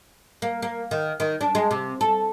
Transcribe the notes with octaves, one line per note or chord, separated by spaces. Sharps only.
A#3
A#3
D#3
D#3
D4
G#3
C3
A4